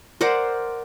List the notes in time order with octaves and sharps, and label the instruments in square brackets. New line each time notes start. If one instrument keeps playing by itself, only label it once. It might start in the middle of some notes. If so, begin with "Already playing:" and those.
[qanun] A#4 C5 D5 F#5